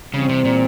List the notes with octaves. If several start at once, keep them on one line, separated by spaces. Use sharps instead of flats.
C#3 E3 G3 C4
C3
A#2